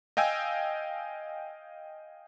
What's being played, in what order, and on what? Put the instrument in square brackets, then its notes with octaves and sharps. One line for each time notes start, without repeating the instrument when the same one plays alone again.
[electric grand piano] D#5 F5 G5 G#5 E6